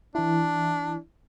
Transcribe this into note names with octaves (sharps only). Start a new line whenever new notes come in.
E3 D4 E4